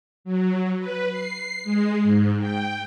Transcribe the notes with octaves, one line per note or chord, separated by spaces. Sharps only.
F#3
B4
C7
G#3
G#2
G5